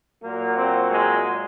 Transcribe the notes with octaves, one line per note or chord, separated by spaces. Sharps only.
A#2 F#3 A#3
C4
G#3